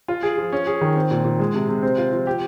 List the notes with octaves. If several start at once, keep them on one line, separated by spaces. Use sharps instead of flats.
F4
G#4
F3
C#4
G#4
D#3
C4
A#2
A#2
G#3
C3
C3
C4
F4
F3
G4